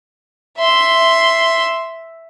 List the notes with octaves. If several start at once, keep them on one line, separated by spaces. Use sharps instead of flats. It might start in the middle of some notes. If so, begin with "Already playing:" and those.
E5 C6